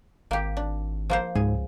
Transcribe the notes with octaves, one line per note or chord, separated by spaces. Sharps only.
G#1 A#3 G4
D4
F3 A#3 C5
C#2 G#2 G#4